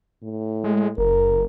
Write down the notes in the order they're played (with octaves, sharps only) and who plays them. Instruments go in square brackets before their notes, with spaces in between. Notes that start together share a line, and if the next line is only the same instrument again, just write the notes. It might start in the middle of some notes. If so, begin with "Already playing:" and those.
[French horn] A2
[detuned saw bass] G#3
[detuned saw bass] F#1 [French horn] A#4